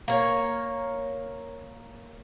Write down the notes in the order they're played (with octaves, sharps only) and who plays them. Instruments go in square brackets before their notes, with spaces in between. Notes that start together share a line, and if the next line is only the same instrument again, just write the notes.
[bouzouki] A#3 C#5